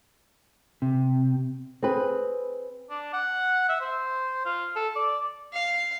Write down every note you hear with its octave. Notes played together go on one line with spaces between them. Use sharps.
C3
C4 G#4 B4
D4
F#5
E5
C5
F4
A4
D5
F5